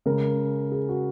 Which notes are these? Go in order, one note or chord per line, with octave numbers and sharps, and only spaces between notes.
C#3 G#3 A#4
G#4
F#4